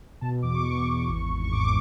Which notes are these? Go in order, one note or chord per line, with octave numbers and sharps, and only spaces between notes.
B2 A5
E2 D6
C#6
B2 C#6
E2
G#1
G#1
C#6
G#2 D6